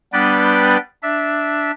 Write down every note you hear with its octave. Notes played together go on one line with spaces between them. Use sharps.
G3 B3 D4 B4 D5 G5
D4 E5